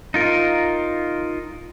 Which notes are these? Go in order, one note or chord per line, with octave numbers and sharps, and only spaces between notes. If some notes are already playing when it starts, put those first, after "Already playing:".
D#4 F4 A#4